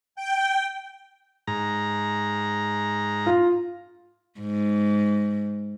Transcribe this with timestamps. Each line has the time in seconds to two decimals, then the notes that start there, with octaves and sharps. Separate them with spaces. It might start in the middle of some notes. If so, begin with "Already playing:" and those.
0.16 G5
1.47 G#2 A#5
3.26 F4
4.40 G#2